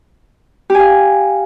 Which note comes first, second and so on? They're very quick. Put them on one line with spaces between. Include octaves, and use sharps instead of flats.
G4 G#5 F5